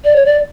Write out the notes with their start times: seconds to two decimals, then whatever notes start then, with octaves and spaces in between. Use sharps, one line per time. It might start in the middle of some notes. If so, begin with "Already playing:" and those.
0.05 D5
0.16 C#5
0.26 D5